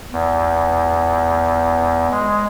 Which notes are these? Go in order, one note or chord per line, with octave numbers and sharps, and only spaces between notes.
E2
G#3